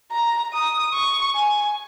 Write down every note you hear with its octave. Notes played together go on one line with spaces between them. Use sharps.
A#5
D#6
C#6
G#5